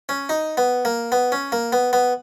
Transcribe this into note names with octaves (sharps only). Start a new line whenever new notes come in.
C#4
D#4
B3
A#3
B3
C#4
A#3
B3
B3